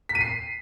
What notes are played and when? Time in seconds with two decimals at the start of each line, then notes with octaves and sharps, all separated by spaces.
0.09 B6
0.15 D#7
0.21 C7